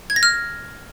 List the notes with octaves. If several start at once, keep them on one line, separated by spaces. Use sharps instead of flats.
G#6
A#6
F6